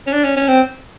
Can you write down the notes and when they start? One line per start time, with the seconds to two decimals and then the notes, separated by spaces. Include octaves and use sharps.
0.06 C#4
0.12 D4
0.24 C#4
0.36 C#4
0.48 C4